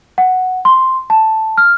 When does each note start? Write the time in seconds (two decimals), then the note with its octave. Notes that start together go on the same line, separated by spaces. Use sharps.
0.18 F#5
0.65 C6
1.10 A5
1.58 F6